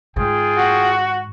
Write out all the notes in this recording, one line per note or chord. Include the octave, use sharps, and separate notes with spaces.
G#2 D#3 F4 G#4 G5
F#4